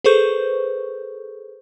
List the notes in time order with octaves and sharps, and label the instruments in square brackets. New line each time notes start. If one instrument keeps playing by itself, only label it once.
[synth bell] G#4 A4 B4 C5 C#6 G6